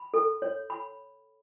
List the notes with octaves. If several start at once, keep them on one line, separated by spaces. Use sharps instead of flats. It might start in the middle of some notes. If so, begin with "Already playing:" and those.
Already playing: B5
A4
C#5
B5